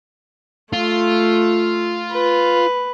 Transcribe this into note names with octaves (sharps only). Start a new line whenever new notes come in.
A3 F4
B4